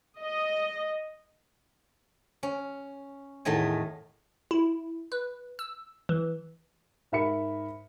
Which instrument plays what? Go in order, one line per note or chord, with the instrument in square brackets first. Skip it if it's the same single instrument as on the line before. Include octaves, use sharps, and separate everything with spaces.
[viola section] D#5
[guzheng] C#4
E2 A2 D#3 A3 D#5 G#5
[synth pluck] E4
B4
E6
E3
[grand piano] G#2 A#4 E5 B5 C#7